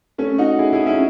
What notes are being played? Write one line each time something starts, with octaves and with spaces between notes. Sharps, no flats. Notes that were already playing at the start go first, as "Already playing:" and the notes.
A3 C#4
D#4 F#4
E4 G#4
E4 G#4
C#4 E4